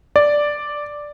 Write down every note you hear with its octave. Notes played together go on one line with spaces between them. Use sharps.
D5